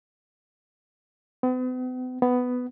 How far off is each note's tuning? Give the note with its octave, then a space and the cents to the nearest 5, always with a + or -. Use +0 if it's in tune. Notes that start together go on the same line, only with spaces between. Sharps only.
B3 +45
B3 +10